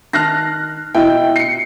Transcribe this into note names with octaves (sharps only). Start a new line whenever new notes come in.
D#3 A5 F6 F#6 A#6 C7
B2 E4 D#5 G5
C7 C#7